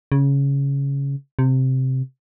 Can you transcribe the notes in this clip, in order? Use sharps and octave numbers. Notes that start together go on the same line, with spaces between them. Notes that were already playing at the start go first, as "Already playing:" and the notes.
C#3
C3